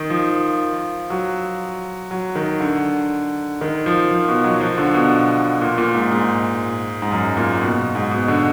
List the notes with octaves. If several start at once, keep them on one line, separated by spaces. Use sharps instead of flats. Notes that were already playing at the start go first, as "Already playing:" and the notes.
Already playing: D#3
F3
F#3
F#3
D#3
D3
D#3
F3
F3
B2
F#3
F3
D3
B2
A#2
A#2
G#2
G#2
G#2
F#2
A#2
B2
G#2
B2
D3